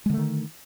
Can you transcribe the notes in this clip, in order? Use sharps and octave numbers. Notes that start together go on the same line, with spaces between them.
D3 D#3 G#3 A3